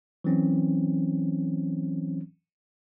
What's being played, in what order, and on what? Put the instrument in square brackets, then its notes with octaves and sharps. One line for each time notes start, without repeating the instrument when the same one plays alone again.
[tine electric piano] E3 F#3 C4 C#4